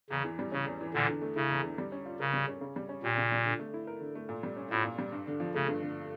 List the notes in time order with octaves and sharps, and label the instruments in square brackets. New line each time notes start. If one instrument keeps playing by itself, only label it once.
[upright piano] E2 [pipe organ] C#3
[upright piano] E3
G3
[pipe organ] C#3 [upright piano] C#4
[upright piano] E2
E3
[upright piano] E2 [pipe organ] A#2 D3
[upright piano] D3
A3
[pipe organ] C#3 [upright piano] E4
[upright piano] E2
D3
G3
C#4
F4
[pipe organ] C#3 [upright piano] A#4
[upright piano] G3
C#4
C#3
G3
C#4
[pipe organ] A#2 [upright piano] G4
[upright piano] C#3
G3
D3
A3
E4
A#4
D3
A3
A#2
G3
C#4
[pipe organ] A2 [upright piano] F4
[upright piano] A#2
G3
G2
D3
F3
[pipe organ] C#3 [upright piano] A3
[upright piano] G2
D3